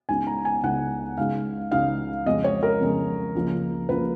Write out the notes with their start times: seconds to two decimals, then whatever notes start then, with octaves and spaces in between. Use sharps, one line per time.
0.09 C#2 C#3 G#3 B3 D#4 G#5
0.27 A#5
0.45 G#5
0.63 C#2 C#3 G#3 B3 D#4 F#5
1.18 C#2 C#3 G#3 D#4 F5
1.71 C#2 C#3 G#3 D#4 F5
2.26 F2 C#3 G#3 C#4 D#5
2.44 C#5
2.63 A#4
2.81 F2 C#3 G#3 C#4
3.35 C#2 C#3 F3 A#3
3.89 C#2 C#3 F3 A#3 B4